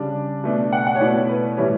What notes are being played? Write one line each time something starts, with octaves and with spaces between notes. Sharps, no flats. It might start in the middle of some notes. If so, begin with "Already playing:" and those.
Already playing: C#3 G3 D4 A5
B2 A3 D4
F#5
F#5
C#5
B2 A3 E4 D5
C#5
B4
A2 E3 G3 C#5